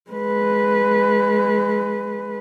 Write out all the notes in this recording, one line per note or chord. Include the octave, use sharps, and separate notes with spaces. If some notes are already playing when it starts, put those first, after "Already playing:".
G#3 B4